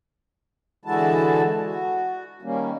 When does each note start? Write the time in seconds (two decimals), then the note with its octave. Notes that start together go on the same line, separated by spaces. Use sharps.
0.85 D3 E3 G#3 E4 F#4 A5
1.65 F#4
2.42 D#3 G3 A#3 C#4